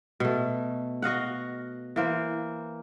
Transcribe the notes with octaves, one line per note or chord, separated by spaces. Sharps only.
B2 A3
F#4 D#5 F5 F#5
E3 A#3 C5